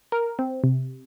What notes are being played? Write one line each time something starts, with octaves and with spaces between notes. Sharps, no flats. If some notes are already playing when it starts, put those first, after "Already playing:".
A#4
C4
C3